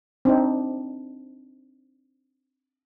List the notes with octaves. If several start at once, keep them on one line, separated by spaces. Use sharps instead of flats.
C4 D4 D#4